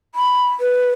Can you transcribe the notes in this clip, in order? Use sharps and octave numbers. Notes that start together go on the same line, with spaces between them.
B5
B4